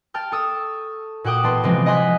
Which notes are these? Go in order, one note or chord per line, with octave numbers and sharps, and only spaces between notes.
G5 A5 F6 G6
A4 C#6 D#6 E6
A#2 F#4 F#5 G5 D6 D#6
A1 B3 A5 C6
C3 E3 F3 G#3 C4
D#5 F#5 G#5 C6 F#6 B6